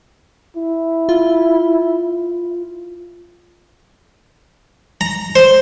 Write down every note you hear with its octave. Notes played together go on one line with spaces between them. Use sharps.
E4
F4
A#5
C5